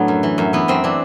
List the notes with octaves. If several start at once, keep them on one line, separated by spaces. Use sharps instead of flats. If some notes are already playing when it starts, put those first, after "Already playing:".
Already playing: A2 F#3 A3 B3 D4
F#2
E3
F#2
E3 B3
F#2 C4
E3 D4